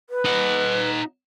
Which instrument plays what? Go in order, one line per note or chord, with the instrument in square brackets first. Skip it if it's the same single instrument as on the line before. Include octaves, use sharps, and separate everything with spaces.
[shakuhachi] B4
[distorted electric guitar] D#4 F#5